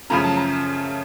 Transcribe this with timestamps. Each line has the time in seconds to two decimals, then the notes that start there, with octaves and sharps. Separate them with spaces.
0.10 F#2 C#3 F3 A3 C#4 A#5
0.24 A5
0.37 A#5